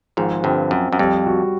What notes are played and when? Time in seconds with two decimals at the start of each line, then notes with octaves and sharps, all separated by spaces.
0.17 G#1 G#2 F3
0.44 G1 G2 C4
0.71 F#2 C4
0.93 F#2
0.99 F2 G3
1.26 F#4